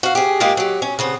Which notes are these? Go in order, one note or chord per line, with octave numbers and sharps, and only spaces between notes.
F#4 F5
G4 G#4
G#3 A#3 F4 G4 G#4
F#3 G4
C#4
C#3 B3 C4